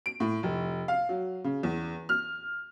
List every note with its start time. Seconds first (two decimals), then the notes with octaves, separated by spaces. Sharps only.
0.06 D7
0.20 A2
0.43 F1
0.88 F5
1.09 F#3
1.44 C#3
1.63 E2
2.09 F6